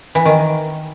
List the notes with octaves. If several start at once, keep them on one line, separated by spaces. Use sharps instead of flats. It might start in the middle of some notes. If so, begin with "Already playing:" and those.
E3
D#3